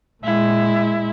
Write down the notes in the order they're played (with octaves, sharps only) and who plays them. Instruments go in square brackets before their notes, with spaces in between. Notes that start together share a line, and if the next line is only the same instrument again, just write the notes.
[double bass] A#2 G#3 [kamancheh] E4